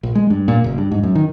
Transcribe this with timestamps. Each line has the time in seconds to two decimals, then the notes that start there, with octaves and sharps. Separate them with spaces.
0.03 A#1
0.15 G#3
0.30 G2
0.48 A#2
0.64 F#1
0.78 G2
0.92 G#2
1.03 F#2
1.15 D#3